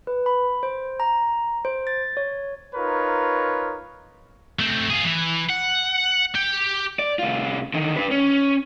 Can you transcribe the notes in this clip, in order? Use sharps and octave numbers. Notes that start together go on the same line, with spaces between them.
B4
B5
C5
A#5
C5
A6
C#5
D#4 F4 A#4 B4 C#5
A3 C4
F4 G#4
E3
F#5
G4
D5
C2 F4
D3 D#3
D4 B4
C#4